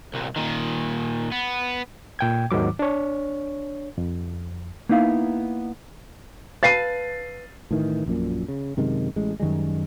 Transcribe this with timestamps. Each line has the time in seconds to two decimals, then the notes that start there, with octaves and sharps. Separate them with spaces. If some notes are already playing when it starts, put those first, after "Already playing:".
0.14 C2 A#2
0.36 A#2 D#3
1.32 B3
2.19 A#2 G5 G#6
2.51 D#2 G#2 D#3 F#3 D6
2.79 D4 C#5
3.98 F2
4.89 A#3 B3 D#4 E4 F5
6.63 B4 F5 A5 A6 C7 D#7
7.71 A2 D#3 E3
8.06 A#1 F#2 A#2
8.48 C#3
8.77 F#2 C3 D#3 G#3
9.16 A1 G#3
9.40 F#2 D#3 G3 G#3